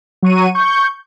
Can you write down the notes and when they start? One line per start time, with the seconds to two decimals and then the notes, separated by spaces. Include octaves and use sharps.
0.23 F#3 C#6 D#7
0.55 C#6 G6